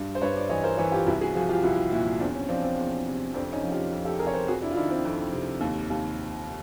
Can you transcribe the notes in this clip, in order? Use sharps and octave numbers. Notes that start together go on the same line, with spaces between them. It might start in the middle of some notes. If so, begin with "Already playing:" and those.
Already playing: G2
C5
G2 B4 C#5
C5 D5
E3 C#5 D#5
A#4 C5
E3 B4 C#5
F4 G4
C2 E4 F#4
F#4 G#4
F3 F#4 G#4
F4 G4
C2 E4 F#4
A#2 E4 F#4
E2 C4 D4
C#4
F3 C4 D4
C4
E2
C3
F2 C4 D4
C#4 D#4
F3
F4 G4
F2
G4 A4
C3 G#4 A#4
C#5
A#4 C5
F2 F#4 G#4
D4 E4
F4
D#3 D4 E4
C4 D4
F2
C3
D#2
D#2